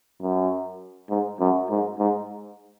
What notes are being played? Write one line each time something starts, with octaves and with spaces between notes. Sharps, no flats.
F#2
G#2
F#2
G#2
G#2